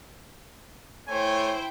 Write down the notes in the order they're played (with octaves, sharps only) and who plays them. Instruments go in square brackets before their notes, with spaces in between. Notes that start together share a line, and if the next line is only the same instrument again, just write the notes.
[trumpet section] A3 C#5 G#5 [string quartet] E4 C5 G5